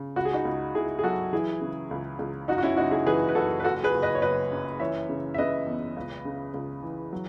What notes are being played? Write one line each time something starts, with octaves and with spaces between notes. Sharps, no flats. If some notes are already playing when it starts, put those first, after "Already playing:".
Already playing: C#3
C#2 F#4
G#4
D#4 F#4
C#2
C#2 E4 G#4
G#4
F#3 F#4 A4
E3 E4 G#4
C#3
C#2
C#2
F#2 D#4 F#4
F#4
C#4 E4
F#1 D#4 F#4
E4 G#4
E3 G#4 B4
B4
F#1 F#4 A4
B4
F#1 F#4 A4
G#4 B4
F#1
B4 D#5
C#5
F#1 B4 D#5
F#2
E3 C#5 E5
C#3
E5
C#3 B4 D#5
E2
C#2
C#3
C#2
E3
F#3